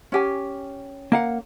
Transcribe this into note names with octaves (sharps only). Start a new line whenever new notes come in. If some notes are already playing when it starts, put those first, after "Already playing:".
C#4 G4 G#5
A#3 F5 F#5